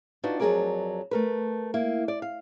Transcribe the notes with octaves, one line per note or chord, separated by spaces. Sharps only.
D4 D#4 F4 F#4 B4 D#5
F2 F#3 D4 G#4 A#4 D5
A3 A#4 B4
A#3 E4
D5
F5